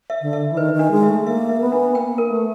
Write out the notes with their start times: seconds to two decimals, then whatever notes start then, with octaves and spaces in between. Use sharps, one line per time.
0.10 E5
0.22 D3
0.33 E5
0.52 E3
0.57 D#3 B4
0.74 D#3
0.79 D4
0.91 G#3
1.03 E5
1.09 A3
1.26 A#3 E5
1.49 E5
1.60 B3
1.72 D4
1.95 A#3 G5
2.18 A#4
2.30 A3